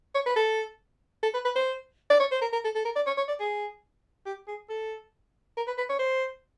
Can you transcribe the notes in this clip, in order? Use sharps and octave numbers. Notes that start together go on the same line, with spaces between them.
C#5
B4
A4
A4
B4
B4
C5
D5
C#5
C5
A#4
A#4
A4
A4
A#4
D5
C#5
C#5
D5
G#4
G4
G#4
A4
A#4
B4
B4
C#5
C5